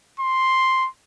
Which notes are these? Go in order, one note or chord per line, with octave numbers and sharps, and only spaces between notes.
C6